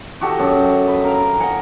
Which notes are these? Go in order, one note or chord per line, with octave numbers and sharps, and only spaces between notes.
F#4 G4 A4 D#5
F#2
B4
A#4 F5
D#5 F#5 G#5